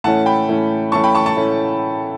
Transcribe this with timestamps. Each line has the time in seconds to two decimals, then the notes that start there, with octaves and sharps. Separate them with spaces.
0.04 A2 E3 A3 C#4 F#5 A5
0.26 G5 B5
0.48 A2 E3 A3 C#4
0.92 A2 E3 A3 C#4 A5 C#6
1.04 G5 B5
1.15 A5 C#6
1.26 A5 C#6
1.37 A2 E3 A3 C#4